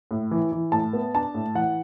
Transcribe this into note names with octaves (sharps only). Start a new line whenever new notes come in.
A2
E3
E3
A2 A5
B3
D4 A5
A2
E3 F#5